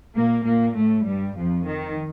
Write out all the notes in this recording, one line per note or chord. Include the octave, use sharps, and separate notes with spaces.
A#2 A#3
A#2 A#3
A2 A3
G2 G3
F2 F3
D#3